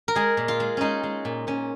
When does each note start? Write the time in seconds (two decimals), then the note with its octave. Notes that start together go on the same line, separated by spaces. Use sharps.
0.08 A#4
0.15 G#3 G#4
0.37 A#2
0.48 F4
0.60 G#3
0.77 G#3 C#4 D#4
1.03 G#3
1.25 A#2
1.47 A#2 C#4